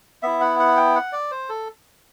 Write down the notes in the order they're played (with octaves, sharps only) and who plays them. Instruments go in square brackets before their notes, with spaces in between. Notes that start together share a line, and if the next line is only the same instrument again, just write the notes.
[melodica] B3 E4 E5
F#5
F#5
G5
F#5
D5
C5
A4